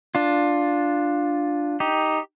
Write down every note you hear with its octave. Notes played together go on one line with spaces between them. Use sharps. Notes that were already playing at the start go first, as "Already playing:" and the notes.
D4 F4
D#4 G4